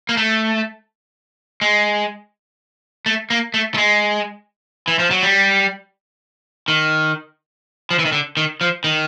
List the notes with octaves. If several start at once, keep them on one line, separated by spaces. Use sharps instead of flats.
A#3
A3
G#3
A3
A#3
A3
A3
G#3
E3
F3
F#3
G3
D#3
F3
E3
D#3
D3
D#3
F3
D#3